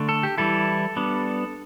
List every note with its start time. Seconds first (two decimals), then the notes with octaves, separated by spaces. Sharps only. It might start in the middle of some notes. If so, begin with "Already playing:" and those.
Already playing: D3 A3 D4
0.09 A4
0.23 G4
0.38 E3 G3 E4 A4
0.97 G3 B3 D4